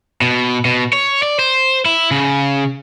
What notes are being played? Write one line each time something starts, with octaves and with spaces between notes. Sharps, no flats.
B2
B2
C#5
D5
C5
E4
C#3